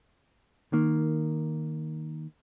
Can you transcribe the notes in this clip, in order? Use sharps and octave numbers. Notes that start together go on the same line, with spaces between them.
D#3 A#3